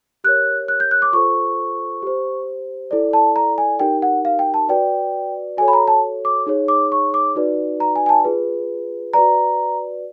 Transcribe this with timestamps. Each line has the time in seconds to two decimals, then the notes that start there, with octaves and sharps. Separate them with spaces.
0.24 G4 A#4 C#5 F#6
0.68 F#6
0.80 G6
0.91 F#6
1.02 D6
1.13 F4 A4 C5 C#6
2.02 G4 C5
2.91 E4 A4 D5
3.13 A5
3.36 A#5
3.58 G#5
3.79 D#4 G4 A#4 G5
4.02 F#5
4.25 F5
4.39 G5
4.54 A5
4.69 F#4 B4 D5 G5
5.57 F#4 A4 C#5 G#5
5.68 B5
5.73 A#5
5.88 A5
6.25 D6
6.46 D#4 G#4 C#5
6.68 D6
6.92 C#6
7.14 D6
7.36 D#4 F#4 B4 D5
7.80 A#5
7.96 G#5
8.06 G#5
8.09 A5
8.24 F4 G#4 B4
9.13 F#4 B4 D5 A#5